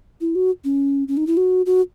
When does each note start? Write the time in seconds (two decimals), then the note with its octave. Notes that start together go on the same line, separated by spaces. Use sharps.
0.21 E4
0.35 F#4
0.64 C#4
1.08 C#4
1.17 D#4
1.27 E4
1.37 F#4
1.66 F#4